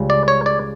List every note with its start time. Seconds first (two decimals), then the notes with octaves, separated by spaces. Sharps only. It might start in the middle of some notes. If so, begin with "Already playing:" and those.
Already playing: C#2 C#3 G3
0.10 D5
0.28 C#5
0.46 D5